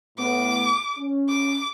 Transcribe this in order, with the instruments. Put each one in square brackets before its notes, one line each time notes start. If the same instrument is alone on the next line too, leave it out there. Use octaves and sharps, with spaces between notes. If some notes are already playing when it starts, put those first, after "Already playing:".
[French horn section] A2 B3 [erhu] D6
[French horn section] C#4
[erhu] D6